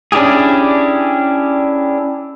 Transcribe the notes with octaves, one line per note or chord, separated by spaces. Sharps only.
C#4 D4 E4 G4 G#4